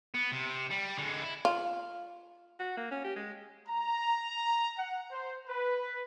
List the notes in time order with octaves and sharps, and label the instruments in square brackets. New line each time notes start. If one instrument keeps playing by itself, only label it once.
[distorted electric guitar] B3
C3
G3
D3 G#3
E4
[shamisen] F4
[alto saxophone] F#4
A#3
C#4
G4
G#3
[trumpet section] A#5
F#5
C5
B4